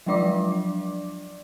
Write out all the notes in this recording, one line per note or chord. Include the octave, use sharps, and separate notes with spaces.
F3 F#3 G#3 D4 D5 D6